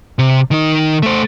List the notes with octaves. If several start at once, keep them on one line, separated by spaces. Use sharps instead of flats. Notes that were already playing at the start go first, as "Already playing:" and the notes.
C3
D#3 D#4
A3 C5